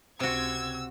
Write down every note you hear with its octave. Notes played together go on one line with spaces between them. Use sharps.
C#2 C3 C4 F#4 E6 G#6